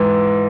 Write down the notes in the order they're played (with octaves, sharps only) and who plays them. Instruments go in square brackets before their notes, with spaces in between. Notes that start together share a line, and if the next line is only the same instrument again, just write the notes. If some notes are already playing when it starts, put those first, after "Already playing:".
Already playing: [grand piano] G#2 E3